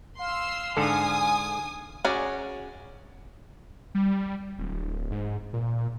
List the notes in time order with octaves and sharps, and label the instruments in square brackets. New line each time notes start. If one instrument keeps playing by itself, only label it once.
[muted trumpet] F5 [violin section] C6 E6
[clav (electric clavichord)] G#2 D3 A4 [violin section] G#5 D#6
[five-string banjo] C#4 F#4 G#4 D5 G#5
[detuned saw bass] G3
D1
G#2
A#2